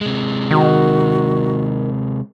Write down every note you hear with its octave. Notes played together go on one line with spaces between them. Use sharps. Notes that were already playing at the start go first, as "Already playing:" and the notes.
C3 G#3
D#3 F#4